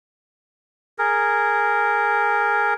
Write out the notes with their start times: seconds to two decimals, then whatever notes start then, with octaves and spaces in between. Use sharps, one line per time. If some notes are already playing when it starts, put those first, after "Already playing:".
0.99 G#4 A#4